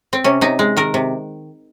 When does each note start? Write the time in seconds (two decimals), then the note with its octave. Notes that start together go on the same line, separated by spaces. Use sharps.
0.13 C4
0.24 C3 C#4
0.41 C3 D#4
0.59 G#3
0.77 D#3 A#4
0.94 C3